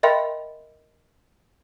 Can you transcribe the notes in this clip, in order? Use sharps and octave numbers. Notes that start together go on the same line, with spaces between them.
A#4 D#5 E5 G5 B5 C6